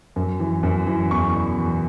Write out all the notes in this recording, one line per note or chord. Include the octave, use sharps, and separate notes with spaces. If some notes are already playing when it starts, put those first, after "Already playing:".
F#2
E3
F#2
E3
E2 C#6
B2
E2